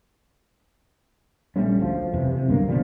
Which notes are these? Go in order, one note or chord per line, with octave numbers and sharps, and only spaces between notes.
A#1 G3 A3 C#4
D2 F3
F2 C3 E3
C3
B1 G2 D3 A#3
B2 D3 F3 G3